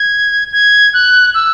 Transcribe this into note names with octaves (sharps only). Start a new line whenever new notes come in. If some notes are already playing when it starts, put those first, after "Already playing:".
Already playing: G#6
G#6
F#6
E6